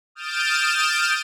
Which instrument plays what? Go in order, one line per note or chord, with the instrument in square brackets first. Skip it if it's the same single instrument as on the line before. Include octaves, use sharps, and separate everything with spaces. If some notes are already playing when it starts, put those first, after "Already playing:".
[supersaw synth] D#6 F6 G6 A6 D7 E7